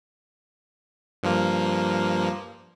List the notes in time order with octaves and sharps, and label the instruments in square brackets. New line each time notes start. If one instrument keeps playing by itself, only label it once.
[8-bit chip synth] G2 F3 A#3